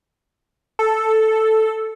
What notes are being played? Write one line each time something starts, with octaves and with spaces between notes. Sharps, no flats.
A4